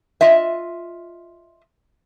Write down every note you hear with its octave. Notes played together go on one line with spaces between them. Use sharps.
F4 D#5 E5